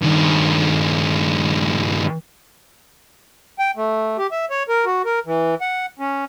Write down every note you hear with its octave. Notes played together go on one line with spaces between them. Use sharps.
G2 D#3
G5
A3
G4
E5
C#5
A#4
F#4
A#4
E3
F#5
C#4